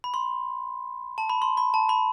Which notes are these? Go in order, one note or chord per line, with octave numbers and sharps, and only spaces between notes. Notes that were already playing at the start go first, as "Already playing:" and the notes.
B5
C6
A5
B5
C6
B5
A5
B5